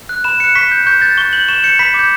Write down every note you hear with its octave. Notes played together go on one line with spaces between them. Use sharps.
F#6
B5 E7
F#6 C#7
C#6 B6
G6
C#6 G6
G6 A6
C#6 G7
G6 F#7
C#6 E7
G6 C#7
B5 B6
D6 G6